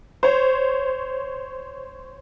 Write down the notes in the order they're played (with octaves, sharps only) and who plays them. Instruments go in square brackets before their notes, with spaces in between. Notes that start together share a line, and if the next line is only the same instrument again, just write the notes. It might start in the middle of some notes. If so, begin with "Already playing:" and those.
[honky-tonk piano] C5 C#5